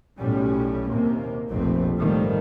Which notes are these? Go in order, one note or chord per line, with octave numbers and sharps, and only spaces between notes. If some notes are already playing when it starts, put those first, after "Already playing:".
B1 A2 G3 C#4
D#2 C3 A#3
F1 A#1 F2 B2 A3 C4
D#2 G#2 D#3 F3 G3 A3